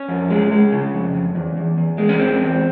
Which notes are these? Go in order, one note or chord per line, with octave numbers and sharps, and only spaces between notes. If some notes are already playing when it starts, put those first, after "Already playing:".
Already playing: C#4
F2
G#3
G#3
C#3
F2
F2
E2
E2
E2
G#3
C#4
E2 C4
E2